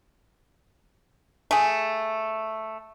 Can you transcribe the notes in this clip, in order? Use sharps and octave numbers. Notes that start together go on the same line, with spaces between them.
A3 G#4